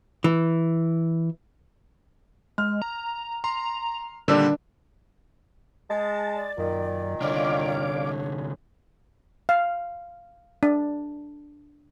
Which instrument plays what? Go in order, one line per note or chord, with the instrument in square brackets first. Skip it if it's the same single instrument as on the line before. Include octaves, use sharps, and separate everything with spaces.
[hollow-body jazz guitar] E3
[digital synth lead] G#3 [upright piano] F6
[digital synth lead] A#5
[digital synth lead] A#5 [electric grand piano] C6
[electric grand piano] A#2 D3 G3 [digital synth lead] D#3 [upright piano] D4 E6
[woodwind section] G#3 [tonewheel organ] A5
[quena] D5
[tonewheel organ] F#2 [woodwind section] A#2 D#3
[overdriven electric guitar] C2 D3 [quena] C#5 [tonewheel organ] D5 F5 D6
[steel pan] F5
D4